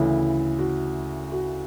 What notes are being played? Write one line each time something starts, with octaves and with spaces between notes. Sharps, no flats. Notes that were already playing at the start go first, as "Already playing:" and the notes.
Already playing: D2 C#3 E3 E4
F#4
F#4